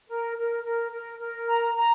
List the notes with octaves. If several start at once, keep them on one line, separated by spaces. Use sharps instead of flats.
A#4
A#4
A#4
A#4
A#4
A#5
A#5